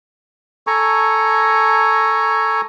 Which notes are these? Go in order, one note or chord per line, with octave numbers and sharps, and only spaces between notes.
A4 G#5 A#5 C#6